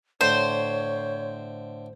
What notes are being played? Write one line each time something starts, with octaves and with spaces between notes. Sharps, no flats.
A2 D3 C5 C#5